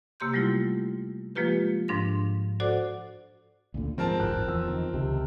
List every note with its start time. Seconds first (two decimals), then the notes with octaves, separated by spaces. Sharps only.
0.20 C3 A#3 G4 C6 G6
0.33 F#3 G3 A3 E4 F4
1.35 F3 G#3 A#3 F4 G4 B4
1.88 G#2 F3 D4 C6 A#6
2.60 F#4 A4 C5 D5 F#5 D6
3.74 D2 A#2 D3
3.98 G#2 F3 C4 A#4 A5
4.20 D1 G1 F4 F#6
4.48 E2 F3 E6
4.67 D#3 D#4
4.93 C#2 C3